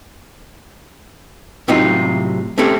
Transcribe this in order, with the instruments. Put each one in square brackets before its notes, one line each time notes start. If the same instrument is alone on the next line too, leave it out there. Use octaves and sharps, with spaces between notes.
[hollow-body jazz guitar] A2 C3 F#3 D#4 F4
A3 C4 C#4 G4 A4